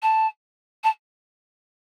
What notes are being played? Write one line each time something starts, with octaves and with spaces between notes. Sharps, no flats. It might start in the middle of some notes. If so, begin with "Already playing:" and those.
A5
A5